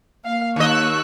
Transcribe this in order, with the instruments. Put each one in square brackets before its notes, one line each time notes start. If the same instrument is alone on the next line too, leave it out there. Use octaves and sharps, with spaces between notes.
[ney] A#3 [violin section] F5
[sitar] D#2 D#5 [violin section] C#6 E6 F#6